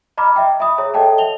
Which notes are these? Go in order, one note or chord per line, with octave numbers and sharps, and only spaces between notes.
D#5 A#5 B5 D6 F6
D#5 E5 G5
E5 B5 D#6
G#4 C#5 E5 A#5
A4 C#5 D#5 F#5 G5 A5
E5 F7 G7